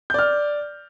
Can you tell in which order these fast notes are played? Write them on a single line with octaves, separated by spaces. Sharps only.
G6 D5 F6